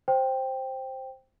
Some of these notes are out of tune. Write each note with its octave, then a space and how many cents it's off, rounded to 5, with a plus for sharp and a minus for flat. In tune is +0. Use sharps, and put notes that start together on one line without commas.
C5 +5 G5 +0